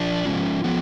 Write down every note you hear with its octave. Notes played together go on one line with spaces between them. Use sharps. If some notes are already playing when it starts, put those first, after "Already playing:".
Already playing: F3 D4
F3 G#3 C#4 F4
F3 B3 F4